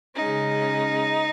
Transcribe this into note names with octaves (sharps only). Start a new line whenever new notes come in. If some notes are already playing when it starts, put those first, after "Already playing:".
C#3 G#3 C#4 D#4